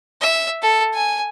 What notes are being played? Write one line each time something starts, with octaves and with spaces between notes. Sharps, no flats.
E5
A4
G#5